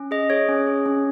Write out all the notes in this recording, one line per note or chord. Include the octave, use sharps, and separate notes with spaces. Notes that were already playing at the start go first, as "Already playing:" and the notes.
Already playing: C#4
G#4 D#5
G#4 C#5
C#4
G#4
C#4